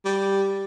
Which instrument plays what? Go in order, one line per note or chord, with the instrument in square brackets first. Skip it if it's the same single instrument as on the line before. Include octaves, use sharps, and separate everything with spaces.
[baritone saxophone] G3